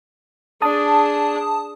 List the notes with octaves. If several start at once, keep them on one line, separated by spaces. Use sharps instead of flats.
D4 G#4 A5 D#6